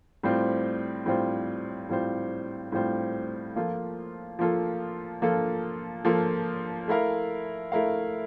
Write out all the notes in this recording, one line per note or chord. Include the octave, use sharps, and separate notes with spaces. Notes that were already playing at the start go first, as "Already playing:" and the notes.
A2 G3 C4 F4 C5
A2 G3 C4 F4 C5
A2 G3 C4 F4 C5
A2 G3 C4 F4 C5
F3 A#3 F4 A4
F3 A#3 F4 A4
F3 A#3 F4 A4
F3 A#3 F4 A4
A3 E4 A#4 F5
A3 E4 A#4 F5